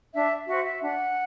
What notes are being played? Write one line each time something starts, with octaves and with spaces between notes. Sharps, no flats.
D4 E5
F#4 C5 E5
E5
D4 F#5